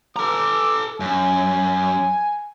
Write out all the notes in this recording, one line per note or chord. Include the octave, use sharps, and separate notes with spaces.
A4 A#5 D6
F#2 G#5